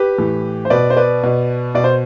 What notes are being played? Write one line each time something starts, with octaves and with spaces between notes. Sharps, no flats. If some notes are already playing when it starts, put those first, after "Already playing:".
Already playing: G4 B4
A2 E3
C5
B2 B4 D5
C5
B4 D5
B2
B2 D5
C5